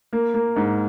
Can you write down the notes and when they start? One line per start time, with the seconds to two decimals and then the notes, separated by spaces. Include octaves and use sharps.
0.13 A#3
0.34 A#3
0.56 G#2